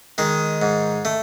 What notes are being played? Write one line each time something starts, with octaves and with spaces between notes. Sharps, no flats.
D#3 G#3
G#2
A3